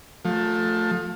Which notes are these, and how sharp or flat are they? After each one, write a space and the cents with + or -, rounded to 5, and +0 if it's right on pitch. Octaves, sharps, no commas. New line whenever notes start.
F3 +25 A3 +10